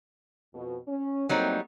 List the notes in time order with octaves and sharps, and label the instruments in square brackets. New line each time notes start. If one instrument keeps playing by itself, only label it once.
[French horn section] F2 B2
C#4
[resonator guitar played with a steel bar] F#3 G3 D#4 [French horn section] A3 A#3 C4